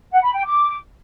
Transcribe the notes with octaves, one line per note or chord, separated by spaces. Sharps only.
F#5
B5
G5
D6